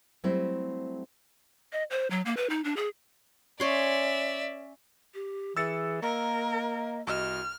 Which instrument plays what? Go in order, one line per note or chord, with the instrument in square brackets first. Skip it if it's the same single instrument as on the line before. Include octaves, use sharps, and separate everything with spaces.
[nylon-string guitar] F#3 G3 A3 C4 E4 C5
[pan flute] D#5
C5
F#3
A#3
B4
D#4
D4
G#4
[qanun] C#4 C#5 C6 [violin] D5 E5
[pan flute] G4
[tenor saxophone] E3 [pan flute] G#4 [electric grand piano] E6 A6 C#7
[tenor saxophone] A#3 [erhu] A#4 [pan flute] D#5
[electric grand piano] C2 D#5 E7 [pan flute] F#4 [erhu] F6